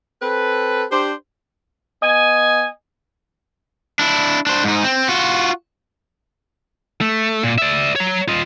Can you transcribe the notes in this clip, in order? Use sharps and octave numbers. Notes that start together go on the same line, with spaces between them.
C4 A4 B4
D4 G4 C5
B3 D#5 G#5
D4 E4
D4 C5
G#2 D#4
C4
F4 F#4
A3
A#2
D5 E5
C#5 A#5
F4 D#5